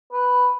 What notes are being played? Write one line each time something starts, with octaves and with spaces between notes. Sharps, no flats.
B4